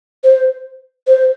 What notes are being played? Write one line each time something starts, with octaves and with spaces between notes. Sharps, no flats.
C5
C5